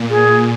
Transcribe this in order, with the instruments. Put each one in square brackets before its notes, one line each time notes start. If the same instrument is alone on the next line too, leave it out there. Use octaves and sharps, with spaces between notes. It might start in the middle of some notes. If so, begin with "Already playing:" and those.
Already playing: [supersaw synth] A#2
[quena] G#4